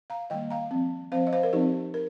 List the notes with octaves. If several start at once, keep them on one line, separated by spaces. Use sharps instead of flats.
F5 A#5
D#3 G3 A#3 D#5 G5
F5 A#5
F3 C4
F3 C4 C5 F5
D#5
C5 F5
A#4
F3 C4 D#4 G4
A#4